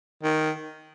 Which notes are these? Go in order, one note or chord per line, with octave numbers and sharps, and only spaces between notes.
D#3